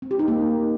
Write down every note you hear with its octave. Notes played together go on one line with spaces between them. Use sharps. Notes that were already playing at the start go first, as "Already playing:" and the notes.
C4
G4
D#4
A#3